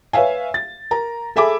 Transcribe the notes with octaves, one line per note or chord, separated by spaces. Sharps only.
B4 C#5 E5 F5 G#5
A6
A#4 A#5
G#4 A4 E5 G#5 B5 D6